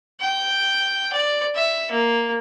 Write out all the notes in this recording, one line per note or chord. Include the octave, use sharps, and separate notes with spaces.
G5
D5
E5
A#3